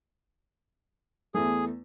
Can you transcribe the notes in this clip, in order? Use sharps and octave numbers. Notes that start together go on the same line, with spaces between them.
E2 A3 G#4